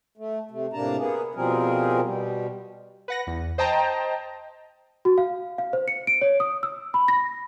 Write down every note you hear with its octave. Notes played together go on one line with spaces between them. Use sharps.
A3
C3 A3
A2 C3 A#3 D4 A5 A#5
A#3 B3 G#4
B2 F3 G3 C4 G#4 A#4
B2 G3
B4 F#5 A#6
E2
C5 D#5 G5 A5 A#5
F#4
F5
F5
C5
C#7
D7
C#5
D#6
E6
B5
A#6